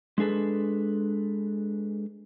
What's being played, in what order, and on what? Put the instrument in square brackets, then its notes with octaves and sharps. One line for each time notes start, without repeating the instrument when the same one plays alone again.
[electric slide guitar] G#3 D4 G#4 A4 B4